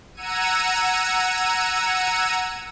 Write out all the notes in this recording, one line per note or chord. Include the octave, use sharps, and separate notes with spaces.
F#5 A#5 E6 G#6 C#7 D#7